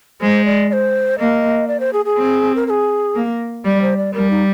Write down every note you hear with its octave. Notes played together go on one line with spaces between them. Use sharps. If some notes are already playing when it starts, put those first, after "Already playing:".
G#3 C5
D5
D5
C5
A#3 D#5
D5
C5
G#4
G#4
C4
A#4
A#4
G#4
A#3
G3 D5
C5
D5
G3 A#4
D#4